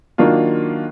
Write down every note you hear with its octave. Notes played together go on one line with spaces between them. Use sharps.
D#3 F#3 A#3 D4 F4